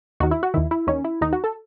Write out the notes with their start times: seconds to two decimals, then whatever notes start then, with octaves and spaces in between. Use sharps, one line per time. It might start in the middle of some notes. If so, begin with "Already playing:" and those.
0.20 D#2 D#3 F#4
0.31 E4
0.43 F#4
0.54 D#2 D#3 E4
0.71 E4
0.87 D#2 D#3 C#4
1.04 E4
1.21 D#2 D#3 D#4
1.33 F#4
1.44 A4